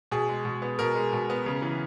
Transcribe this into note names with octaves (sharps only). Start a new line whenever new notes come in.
B2 G#4
G#3
B2
B3
B2 A#4
G#3
B2
B3
C#3
E3